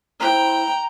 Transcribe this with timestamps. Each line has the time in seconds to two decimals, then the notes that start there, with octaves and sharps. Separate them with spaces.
0.20 E4 C5 G5 A#5